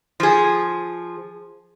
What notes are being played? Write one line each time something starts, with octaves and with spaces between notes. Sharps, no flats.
F3 G#4